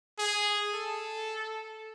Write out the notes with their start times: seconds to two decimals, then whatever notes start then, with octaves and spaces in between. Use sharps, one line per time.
0.19 G#4
0.74 A4